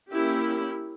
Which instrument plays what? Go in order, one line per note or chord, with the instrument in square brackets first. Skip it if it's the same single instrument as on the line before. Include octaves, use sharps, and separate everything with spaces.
[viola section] A#3 C#4 E4 G4